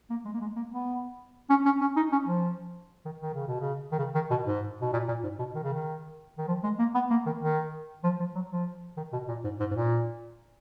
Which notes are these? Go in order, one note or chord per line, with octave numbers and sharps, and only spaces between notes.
A#3
G#3
A#3
G#3
A#3
B3
C#4
C#4
C#4
D#4
C#4
F3
D#3
D#3
C#3
B2
C#3
D#3
C#3
D#3
B2
G#2
B2
A#2
A#2
G#2
B2
D#3
C#3
D#3
D#3
F3
G#3
A#3
B3
A#3
D#3
D#3
F3
F3
F#3
F3
D#3
B2
A#2
G#2
G#2
G#2
A#2